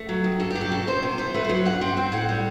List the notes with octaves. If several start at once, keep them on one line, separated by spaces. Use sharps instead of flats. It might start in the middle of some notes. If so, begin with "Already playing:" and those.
Already playing: A3
F#3
D#3
G2 A4
G4
F#3
G4
B2 A4
B2 C5
C3
E3 C5
A3 B4
C5
F#3
G2 F#5
C4 G5
C4 G5
A2 F#5
G3